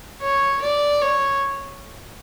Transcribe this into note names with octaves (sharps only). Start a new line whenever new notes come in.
C#5
D5
C#5